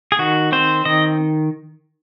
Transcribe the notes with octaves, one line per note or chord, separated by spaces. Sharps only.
G#4
D#3 F#4
C4 C5
D#3 D#5